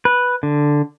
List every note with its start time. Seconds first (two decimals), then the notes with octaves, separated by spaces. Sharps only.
0.05 B4
0.43 D3